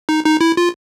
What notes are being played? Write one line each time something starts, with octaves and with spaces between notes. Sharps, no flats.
D#4
D#4
E4
F4